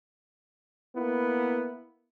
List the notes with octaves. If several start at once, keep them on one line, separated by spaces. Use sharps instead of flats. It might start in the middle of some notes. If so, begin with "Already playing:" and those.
A#3 B3 E4